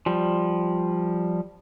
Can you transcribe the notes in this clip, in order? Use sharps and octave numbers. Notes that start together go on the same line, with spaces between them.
F3 G3